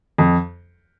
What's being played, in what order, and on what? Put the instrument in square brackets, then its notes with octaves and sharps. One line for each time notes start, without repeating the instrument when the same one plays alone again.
[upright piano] F2